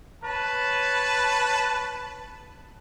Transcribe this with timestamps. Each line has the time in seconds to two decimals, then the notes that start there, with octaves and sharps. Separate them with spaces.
0.24 B4 C#5 A5